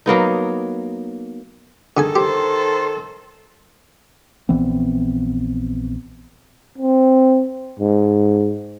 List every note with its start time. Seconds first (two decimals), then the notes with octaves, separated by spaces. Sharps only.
0.06 F#3 A#3 B3 D#4
1.97 D3 D#3 G#4 A4 G#5
2.15 G4 C5
4.49 A#1 E3 B3 C4
6.78 C4
7.79 G#2